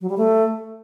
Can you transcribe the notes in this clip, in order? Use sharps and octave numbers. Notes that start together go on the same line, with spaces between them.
F#3
G3
A3